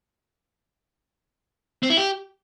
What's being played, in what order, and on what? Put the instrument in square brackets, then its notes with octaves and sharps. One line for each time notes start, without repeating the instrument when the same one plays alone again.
[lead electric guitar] C4
E4
G4